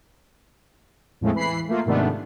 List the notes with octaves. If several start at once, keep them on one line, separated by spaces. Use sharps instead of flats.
E2 A2 F3 G#3 A3 C4
E3 B5 C7
A3 A#3 F4
G#2 C3 D#3 A3 B3 D4